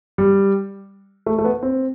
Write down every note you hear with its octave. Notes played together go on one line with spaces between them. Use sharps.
G3
A3
A3
B3
C4